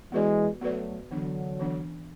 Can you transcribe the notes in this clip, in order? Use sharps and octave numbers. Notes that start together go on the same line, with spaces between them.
E3 G#3 B3 F#4 B4 D5
F#3 A3 B3 F#4 B4 D5
D3 E3 F#3 B3 D4
E3 B3 D4